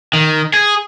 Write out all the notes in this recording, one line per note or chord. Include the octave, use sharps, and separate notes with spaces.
D#3
G#4